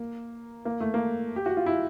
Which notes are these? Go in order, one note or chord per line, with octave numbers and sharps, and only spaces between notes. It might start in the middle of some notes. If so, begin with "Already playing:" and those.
Already playing: A#3
A#3
A3
A#3
G4
F#4
F4
E4